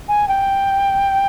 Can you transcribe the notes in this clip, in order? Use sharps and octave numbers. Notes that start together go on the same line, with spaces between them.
G#5
G5